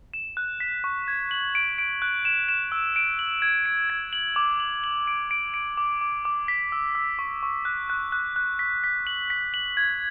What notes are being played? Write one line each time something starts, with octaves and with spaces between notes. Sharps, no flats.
E7
F#6
B6
C#6
G#6
F#7
D7
D7
F#6
E7
E7
E6
D7
F#7
G#6
D7
G#6
F#7
D6
F#7
F#7
D7
D7
D7
D6
D6
D6
B6
E6
E6
C#6
C#6
F#6
F#6
F#6
F#6
B6
B6
F#7
B6
F#7
G#6